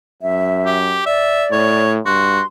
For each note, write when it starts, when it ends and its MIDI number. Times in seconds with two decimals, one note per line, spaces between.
0.22 1.03 42
0.22 0.77 76
0.65 1.04 67
1.06 1.85 74
1.06 1.46 76
1.52 2.00 45
1.52 1.93 73
2.05 2.41 43
2.05 2.40 66
2.05 2.46 84